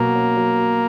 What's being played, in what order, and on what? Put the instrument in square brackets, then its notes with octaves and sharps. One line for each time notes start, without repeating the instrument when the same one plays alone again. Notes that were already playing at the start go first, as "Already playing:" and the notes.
Already playing: [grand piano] B2 F#3 F#4 [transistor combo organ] A#3
[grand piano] C#4
F#3
F#4